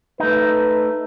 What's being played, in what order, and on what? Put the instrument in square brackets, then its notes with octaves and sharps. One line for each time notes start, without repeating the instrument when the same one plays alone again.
[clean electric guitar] A3 D#4 [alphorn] B4